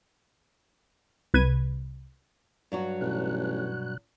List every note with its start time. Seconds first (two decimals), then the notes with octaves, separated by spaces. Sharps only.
1.34 C2 B4 G#6 D#7
2.72 G2 F#3 F#4
3.01 A1 B2 F#6